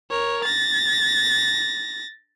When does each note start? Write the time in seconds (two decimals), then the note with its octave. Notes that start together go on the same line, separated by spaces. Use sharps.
0.10 A#4 C#5
0.44 A6 A#6